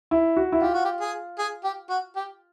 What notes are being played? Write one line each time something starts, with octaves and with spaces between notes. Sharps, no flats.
E4
F#4
E4
F4 G4
F#4
G4
G#4
G#4
G4
F#4
G4